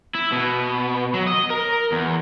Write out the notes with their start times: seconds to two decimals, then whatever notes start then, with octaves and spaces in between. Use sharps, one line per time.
0.15 E4
0.32 B2
1.14 F#3
1.27 D#5
1.50 A#4
1.92 E2